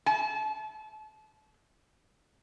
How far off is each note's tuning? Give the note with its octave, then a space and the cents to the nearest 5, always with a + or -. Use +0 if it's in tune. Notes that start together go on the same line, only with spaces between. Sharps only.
A5 -30